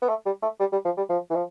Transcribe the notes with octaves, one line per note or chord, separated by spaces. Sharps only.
B3
A3
G3
A3
G3
G3
F3
G3
F3
E3
F3